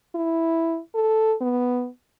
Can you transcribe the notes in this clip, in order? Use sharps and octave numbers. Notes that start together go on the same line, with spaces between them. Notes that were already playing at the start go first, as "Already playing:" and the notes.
E4
A4
B3